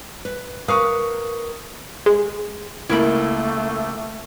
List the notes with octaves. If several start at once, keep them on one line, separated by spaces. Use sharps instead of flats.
B4
A#4 B4 F5 C#6 D#6
G#3
C#2 A3 A#3 E4 A#4 B5